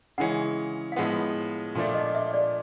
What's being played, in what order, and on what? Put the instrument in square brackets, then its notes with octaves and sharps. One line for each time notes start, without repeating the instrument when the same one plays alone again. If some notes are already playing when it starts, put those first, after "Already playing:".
[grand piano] C#3 E3 G#3 C#4 [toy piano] F#5
[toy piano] F5
[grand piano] A2 F3 G#3 B3 [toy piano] F#5
[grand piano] A#2 F3 A3 D4
[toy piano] D#5
E5
D5